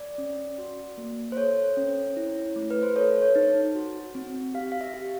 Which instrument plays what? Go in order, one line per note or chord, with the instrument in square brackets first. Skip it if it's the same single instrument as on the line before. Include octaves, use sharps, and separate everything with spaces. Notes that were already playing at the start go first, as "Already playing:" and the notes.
Already playing: [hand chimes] D5
C#4
F#4
A#3
C5
A4 C#5
C#4
E4
A3
B4
C5
A4 C#5
C#5
D#4
F#4
C4
G4 F5
F5
E5
G4